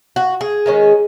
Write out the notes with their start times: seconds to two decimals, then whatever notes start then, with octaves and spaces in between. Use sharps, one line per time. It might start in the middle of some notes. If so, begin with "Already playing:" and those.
0.16 F#4
0.41 G#4
0.66 D#3 G#3 C#4